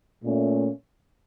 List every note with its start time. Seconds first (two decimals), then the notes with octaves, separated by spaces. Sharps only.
0.24 A#2 A3 C#4